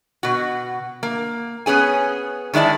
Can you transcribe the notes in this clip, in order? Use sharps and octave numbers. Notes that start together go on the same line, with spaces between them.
B2 F#4
A#3
B3 C#4 G#4 G#5
D#3 G#3 E4 D5 A5